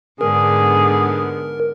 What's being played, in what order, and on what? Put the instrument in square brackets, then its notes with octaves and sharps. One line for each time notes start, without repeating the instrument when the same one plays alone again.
[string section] G#2 D3 B3 [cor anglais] G#4 [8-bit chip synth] A#4